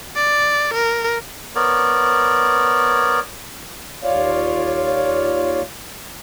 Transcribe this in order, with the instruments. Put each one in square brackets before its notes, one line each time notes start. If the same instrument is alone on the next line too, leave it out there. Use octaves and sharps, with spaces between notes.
[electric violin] D5
A#4
[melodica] B3 A#4 C#5 D5
[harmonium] D#2 F4 C#5 D5 F5